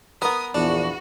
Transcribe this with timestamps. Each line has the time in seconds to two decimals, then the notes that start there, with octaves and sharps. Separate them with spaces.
0.22 B3 A#4 B4 D#6
0.55 A#1 E2 D4 F#4